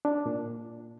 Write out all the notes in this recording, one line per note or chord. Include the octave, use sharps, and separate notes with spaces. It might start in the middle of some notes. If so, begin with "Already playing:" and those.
D4
A#2